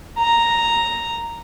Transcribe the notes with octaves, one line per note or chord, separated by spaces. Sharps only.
A#5